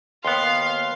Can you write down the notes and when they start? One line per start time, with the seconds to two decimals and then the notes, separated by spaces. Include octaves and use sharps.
0.25 D#2 B3 F5 C6